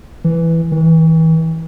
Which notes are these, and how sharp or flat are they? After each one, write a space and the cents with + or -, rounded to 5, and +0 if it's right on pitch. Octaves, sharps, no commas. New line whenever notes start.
E3 +5
E3 -35